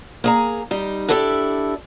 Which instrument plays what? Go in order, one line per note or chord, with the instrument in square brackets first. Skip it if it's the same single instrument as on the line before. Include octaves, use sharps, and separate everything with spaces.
[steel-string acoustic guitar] A#3 G#4 A#5
G3 D#4
D4 E4 G4 A4 C#5 D5